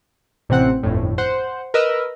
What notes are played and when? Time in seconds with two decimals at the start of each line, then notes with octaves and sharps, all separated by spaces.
0.49 A1 C3 C4 F#5 F#6
0.83 G1 F2 A2
1.18 C5 F#5
1.74 A#4 B4 D#5 E6